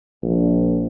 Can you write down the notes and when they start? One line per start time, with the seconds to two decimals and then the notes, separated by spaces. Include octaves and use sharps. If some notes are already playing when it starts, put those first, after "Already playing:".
0.22 A#1